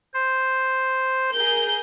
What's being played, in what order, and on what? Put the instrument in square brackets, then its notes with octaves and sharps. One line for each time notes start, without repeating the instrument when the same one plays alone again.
[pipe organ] C5
[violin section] G#4 A#4 G6